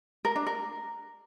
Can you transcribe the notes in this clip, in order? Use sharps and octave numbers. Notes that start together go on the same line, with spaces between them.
A#4
D4
A#4